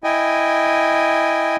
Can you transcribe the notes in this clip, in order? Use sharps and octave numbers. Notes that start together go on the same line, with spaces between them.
E4 D#5 G5 G#5